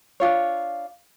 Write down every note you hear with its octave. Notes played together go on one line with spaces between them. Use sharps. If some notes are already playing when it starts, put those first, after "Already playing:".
D4 D#4 F4 C#5